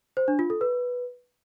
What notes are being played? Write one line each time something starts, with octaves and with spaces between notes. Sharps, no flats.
C5
D4
F4
A4
B4